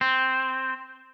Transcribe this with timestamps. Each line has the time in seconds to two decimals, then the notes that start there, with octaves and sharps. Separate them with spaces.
0.01 C4